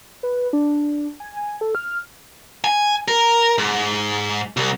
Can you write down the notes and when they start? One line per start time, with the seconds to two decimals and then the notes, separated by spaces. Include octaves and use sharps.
0.23 B4
0.53 D4
1.20 G#5
1.37 G#5
1.61 A4
1.75 F6
2.64 G#5
3.08 A#4
3.58 G#2
4.57 C2